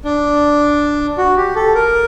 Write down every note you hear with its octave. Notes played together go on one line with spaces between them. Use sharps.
D4
F#4
G4
A4
A#4